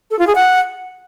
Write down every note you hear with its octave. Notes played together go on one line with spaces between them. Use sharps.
A4
F4
G#4
F#5